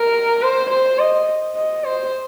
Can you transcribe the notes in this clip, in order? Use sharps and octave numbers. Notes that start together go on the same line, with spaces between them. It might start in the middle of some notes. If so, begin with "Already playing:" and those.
Already playing: A#4
C5
C5
D#5
D#5
C5